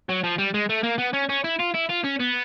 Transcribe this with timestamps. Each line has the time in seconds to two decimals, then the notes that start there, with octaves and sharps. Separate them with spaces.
0.09 F#3
0.24 F3
0.38 G3
0.54 G#3
0.69 A3
0.84 A#3
0.99 B3
1.14 C#4
1.29 C#4
1.44 E4
1.59 F4
1.74 E4
1.89 F4
2.04 C#4
2.20 B3